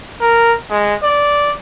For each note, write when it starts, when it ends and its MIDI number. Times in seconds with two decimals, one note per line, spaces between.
0.21 0.53 70
0.70 0.95 56
1.03 1.53 74